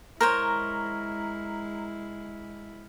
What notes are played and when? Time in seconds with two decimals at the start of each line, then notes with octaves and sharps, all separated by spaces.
0.21 G#3 E4 A#4 C5 C#5 A#5 F6